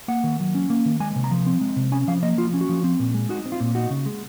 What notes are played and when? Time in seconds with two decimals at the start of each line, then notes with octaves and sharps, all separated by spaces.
0.08 A#3 F#5
0.24 D#3
0.40 F#3
0.55 C#4
0.70 A#3
0.86 D#3
1.00 G#3 G#5
1.16 C3
1.24 A#5
1.31 F3
1.46 C4
1.61 G#3
1.76 C3
1.92 C#4 G#5
2.08 F3 F5
2.23 A#3 D#5
2.38 F3 F4
2.53 C#4
2.61 F#4
2.69 F3
2.84 C4
3.00 A#2
3.14 G#3
3.29 D#4 F#4
3.46 C4
3.52 F4
3.60 A#2
3.75 D#4 F#4
3.90 C#3
4.06 G#3